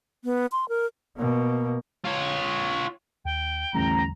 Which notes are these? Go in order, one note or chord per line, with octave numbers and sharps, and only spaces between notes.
B3
C6
A#4
B2 A#3
F4 C#5
D#2 G5
A1 E2 D3 G3 A#5